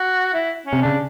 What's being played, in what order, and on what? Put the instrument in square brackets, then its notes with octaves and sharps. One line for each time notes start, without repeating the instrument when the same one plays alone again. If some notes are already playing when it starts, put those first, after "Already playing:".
Already playing: [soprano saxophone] F#4
E4
C#4
[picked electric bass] C3
[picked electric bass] C#3 [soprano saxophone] D4